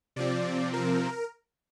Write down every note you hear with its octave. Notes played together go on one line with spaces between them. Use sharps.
C3 F3 C4 D5
A#4